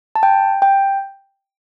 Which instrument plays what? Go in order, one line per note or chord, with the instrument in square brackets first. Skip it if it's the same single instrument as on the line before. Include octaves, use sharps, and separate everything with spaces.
[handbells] A5
G5
G5